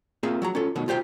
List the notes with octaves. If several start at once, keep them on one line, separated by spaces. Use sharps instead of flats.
A#3 C4 F4 G#4 E5
F#3 F#4 A#5
C#4 F4 A4
B2 D#3 F#3
F4 G4 C5 G5